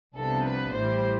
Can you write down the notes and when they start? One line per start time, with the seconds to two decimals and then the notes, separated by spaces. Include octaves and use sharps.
0.15 C2 C3 F3 B3 D4 A4
0.44 B4
0.73 A1 A2 E3 G3 C5